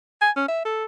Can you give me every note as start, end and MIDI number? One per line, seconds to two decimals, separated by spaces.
0.22 0.31 80
0.36 0.48 61
0.48 0.65 76
0.65 0.85 69